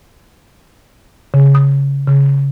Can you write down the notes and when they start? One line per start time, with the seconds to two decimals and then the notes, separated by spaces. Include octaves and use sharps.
1.34 C#3
1.55 D#6
2.07 C#3